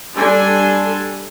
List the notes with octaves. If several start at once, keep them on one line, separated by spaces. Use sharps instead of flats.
G3 D4 A4 G#5 C6